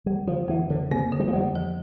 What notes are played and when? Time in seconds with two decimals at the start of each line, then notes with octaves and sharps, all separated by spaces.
0.06 F2 G3
0.27 D3 F3
0.49 F2 E3
0.70 D3 F3
0.91 C3 A#3
1.12 D3
1.20 G3
1.28 F3
1.33 F2 G3
1.55 F3